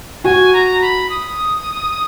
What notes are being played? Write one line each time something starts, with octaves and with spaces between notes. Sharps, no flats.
F#4 G#5
A#5
B5
D#6